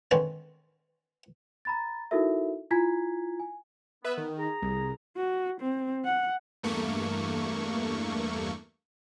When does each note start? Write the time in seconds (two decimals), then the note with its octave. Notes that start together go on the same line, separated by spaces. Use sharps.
0.11 D3 D#3 G#3 C4 C#4 B4
1.65 A#5 B5 A6
2.11 D#4 E4 F#4 A4 A#4 E5
2.71 E4 F4 G#5 A#5 G#6 B6
3.40 G#5
4.04 B3 B4 E5
4.17 D#3
4.38 G#4 A#5
4.62 C2
5.17 F#4
5.61 C4
6.05 F#5
6.63 E2 G2 A3 A#3 C#6